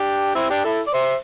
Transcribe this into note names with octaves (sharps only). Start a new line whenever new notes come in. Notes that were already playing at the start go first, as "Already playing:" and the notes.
Already playing: D4 G4
C4 E4
D4 G4
E4 A4
D5
C5 E5